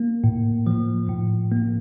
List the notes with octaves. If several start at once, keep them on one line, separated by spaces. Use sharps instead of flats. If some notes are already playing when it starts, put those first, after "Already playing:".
Already playing: A#3
A2
F3
A2
A#3